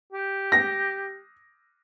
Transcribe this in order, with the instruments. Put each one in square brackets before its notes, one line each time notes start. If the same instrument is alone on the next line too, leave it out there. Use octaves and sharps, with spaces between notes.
[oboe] G4
[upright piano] A#6